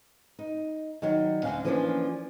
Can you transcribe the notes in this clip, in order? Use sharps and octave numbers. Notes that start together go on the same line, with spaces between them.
D#4
D#3 F#3 G3 C#5
D2 F#3 C#4 D4 F5
E3 F3 A#3 C#4 D4 F4